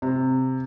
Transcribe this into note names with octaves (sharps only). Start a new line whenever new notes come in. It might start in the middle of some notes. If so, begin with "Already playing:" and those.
C3